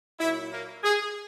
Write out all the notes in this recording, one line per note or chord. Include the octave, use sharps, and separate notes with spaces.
A#2 F#3 E4
A#3
G#4